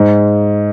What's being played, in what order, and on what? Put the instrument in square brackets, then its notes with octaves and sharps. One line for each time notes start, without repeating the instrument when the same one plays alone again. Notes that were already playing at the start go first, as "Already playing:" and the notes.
Already playing: [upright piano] G#2